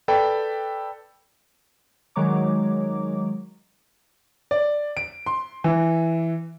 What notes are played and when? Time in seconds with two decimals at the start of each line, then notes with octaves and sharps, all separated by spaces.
0.08 A4 B4 D5 G5 B5
2.16 D#3 F#3 G#3 C#5 A#5 D6
4.51 D5
4.97 D7
5.26 C6
5.64 E3